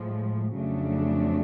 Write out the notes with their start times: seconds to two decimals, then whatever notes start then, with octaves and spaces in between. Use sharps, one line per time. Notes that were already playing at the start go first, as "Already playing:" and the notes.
Already playing: A2 F3 G#3
0.56 F2 C#3 F#3 A3 D4